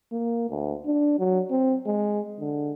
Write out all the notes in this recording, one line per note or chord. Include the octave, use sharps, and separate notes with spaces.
A#3
D2
D4
F#3
C4
G#3
D3